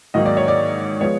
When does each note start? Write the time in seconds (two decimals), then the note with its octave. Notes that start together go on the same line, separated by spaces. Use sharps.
0.14 G#2 D#3 F#3 A#3 D#4 D#5
0.26 D5
0.37 C#5
0.48 D5
1.01 F3 G#3 B3 C#5